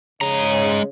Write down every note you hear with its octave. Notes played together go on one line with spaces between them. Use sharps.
C#3 G#3 C#5 A#5